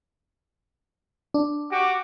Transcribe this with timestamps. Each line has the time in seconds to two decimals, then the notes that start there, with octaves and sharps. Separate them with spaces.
1.34 D4
1.70 F#4 G4 D6